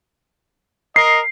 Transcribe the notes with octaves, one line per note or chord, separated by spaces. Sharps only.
A#4 D#5 C7